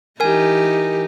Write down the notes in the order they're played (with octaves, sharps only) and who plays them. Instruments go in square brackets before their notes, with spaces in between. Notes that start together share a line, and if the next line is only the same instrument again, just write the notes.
[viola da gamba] E3 D#4 G4 [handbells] A#4 G#5